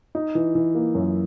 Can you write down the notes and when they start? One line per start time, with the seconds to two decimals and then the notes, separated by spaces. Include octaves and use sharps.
0.15 D#4
0.35 E3
0.55 E3
0.75 A#3
0.95 F#2